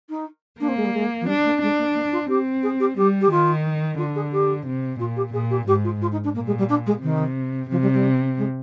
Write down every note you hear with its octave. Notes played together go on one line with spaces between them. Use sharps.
D#4
A#3 D4
C4
G#3
G3
G#3
F3
G3 D4
A#3
G#3 D4
A#3
A#3
F4
C4 G4
G#4
G4
G3 G4
G4
D#3 F4
D3 F4
G#4
G4
C3
A#2 F4
G4
A#2 G#4
G4
G#2 G4
F4
F4
D#4
D4
A#2 A#3
G#3
G3
D4
G#3
C3 D#3
C3 F3
G3
G3
G#3